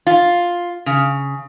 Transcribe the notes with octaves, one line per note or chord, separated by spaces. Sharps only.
F4
C#3